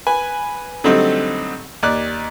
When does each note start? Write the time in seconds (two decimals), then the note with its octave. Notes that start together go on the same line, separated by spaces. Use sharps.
0.07 B4 G#5
0.84 D3 F#3 G3 A3 C4 D#4
1.83 D#2 D5 F#6